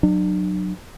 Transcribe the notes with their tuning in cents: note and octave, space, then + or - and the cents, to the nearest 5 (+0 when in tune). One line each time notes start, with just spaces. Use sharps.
F#3 +0 D4 +40